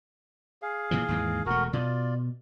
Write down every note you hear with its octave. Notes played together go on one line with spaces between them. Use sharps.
G#4 F5
A#2 E3 F3
D#2 G#2 E3
E1 A3 F#4 A#4
B2 F4 D5